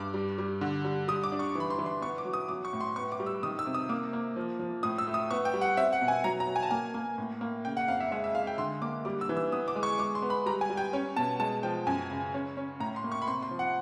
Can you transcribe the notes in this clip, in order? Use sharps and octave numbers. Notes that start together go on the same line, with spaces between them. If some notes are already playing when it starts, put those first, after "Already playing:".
Already playing: G2 D6
G3
G3
D3
G3
G3 D#6
D6
D4
C#6
E3 B5
C6
E3
C6
B3 C#6
D6
F#3
D#6
F#3 D6
C#6
A2
C6
B3 C#6
D6
G3
E6
D#3 D#6
E6
C3
D#6
A#3 D6
A#3
F3
F3
A2 D#6
E6
A3
D#6
B3 C#6
G5
G3
F#5
C4 E5
F#5
B2
G#5
F#3 A#5
A#5
F#3
G#5
A5
A#3 G#5
A#3
A2
A#3
C#3 G5
F#5
F2 F5
E5
G#3 E5
E5
G#3 F5
G5
D3 C6
A#3 D6
G3 D6
E6
E3
E6
B3 D#6
D6
G#3
C#6
G#3 D6
C6
B3
B5
G3 A#5
G#5
G3
G5
C#4
B2 A5
G#3 A5
F3 G5
F#2 G#5
C#3
C#4
C#4
A2 A#5
C6
A#3
C#6
B5
C3 C6
C6
F3
F#5